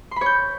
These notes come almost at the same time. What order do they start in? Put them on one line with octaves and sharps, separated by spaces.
C6 B5 C#5 G6